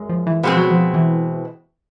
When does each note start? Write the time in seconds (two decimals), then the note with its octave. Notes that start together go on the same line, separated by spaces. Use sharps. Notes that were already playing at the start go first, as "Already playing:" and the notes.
Already playing: F#2 G#3
0.09 F3
0.27 E3
0.43 B2 F3 G#3 C4
0.57 F#3
0.71 F3
0.94 E3